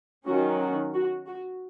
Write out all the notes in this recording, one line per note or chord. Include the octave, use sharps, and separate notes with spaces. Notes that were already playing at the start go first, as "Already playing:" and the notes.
D#3 F#3 C#4 F#4
F#4
F#4
F#4